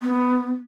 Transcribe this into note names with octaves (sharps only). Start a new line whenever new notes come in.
B3